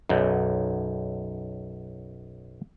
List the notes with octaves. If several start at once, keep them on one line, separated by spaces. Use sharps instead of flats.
B1 F#2